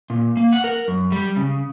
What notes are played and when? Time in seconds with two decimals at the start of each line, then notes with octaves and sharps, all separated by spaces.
0.10 A#2
0.37 A#3
0.53 F#5
0.64 A#4
0.88 F#2
1.12 G3
1.36 C#3